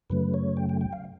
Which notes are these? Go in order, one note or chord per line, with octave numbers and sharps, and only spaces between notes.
F#2 C#3 F#3 A3 B4
C#5
G5
G5
G5
F5